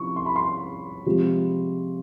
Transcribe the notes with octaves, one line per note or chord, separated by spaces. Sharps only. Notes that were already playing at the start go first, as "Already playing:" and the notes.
Already playing: C3 F3 C#4 E4 C#6
C6
B5
C6
C3 F3 G#3